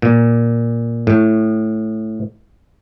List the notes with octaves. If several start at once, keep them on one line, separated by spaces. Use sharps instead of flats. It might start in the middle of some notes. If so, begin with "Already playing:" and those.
A#2
A2